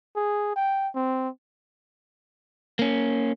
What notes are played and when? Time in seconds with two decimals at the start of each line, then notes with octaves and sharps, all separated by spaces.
0.16 G#4
0.56 G5
0.95 C4
2.79 A#3 C#4